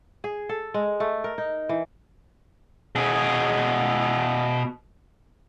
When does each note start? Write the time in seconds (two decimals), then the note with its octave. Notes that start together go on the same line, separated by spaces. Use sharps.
0.24 G#4
0.49 A4
0.74 G#3
1.00 A3
1.24 A#4
1.38 D#4
1.69 E3
2.95 B2 G#4